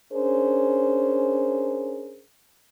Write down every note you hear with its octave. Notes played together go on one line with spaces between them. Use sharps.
C#4 D4 G#4 A#4 C5